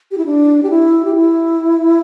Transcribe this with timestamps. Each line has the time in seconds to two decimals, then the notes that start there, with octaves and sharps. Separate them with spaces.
0.11 G4
0.18 E4
0.26 D4
0.63 G4
0.70 E4
1.05 G4
1.15 E4